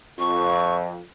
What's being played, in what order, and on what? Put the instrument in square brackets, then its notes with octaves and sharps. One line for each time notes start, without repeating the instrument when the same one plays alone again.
[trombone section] F2 [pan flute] C#6